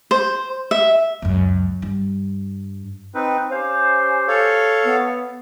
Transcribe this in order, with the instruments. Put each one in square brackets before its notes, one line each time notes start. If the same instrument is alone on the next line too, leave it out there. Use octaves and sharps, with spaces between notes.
[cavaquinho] C5
E5
[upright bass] C#2 F#2
G2
[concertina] C4 D#4 B4
[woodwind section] C#4 G4 C5 [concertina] F5
[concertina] A4 C#5 F5
[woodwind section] B3